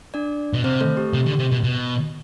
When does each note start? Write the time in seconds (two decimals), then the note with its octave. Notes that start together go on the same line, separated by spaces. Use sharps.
0.14 D4 D5
0.53 B2
0.64 C3 C4 C5
0.81 A3 A4
0.97 G4
1.14 C3 G4
1.26 D3
1.39 C3
1.52 B2
1.64 B2